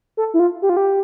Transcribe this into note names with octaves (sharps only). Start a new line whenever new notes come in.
A4
E4
F4
G4
F4
G4